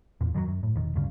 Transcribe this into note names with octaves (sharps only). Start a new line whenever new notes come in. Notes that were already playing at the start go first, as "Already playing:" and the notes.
E2 A#2
F#2 D#3 F3 F#3
F#2
A2
E1 D#3
D2 G2 C#3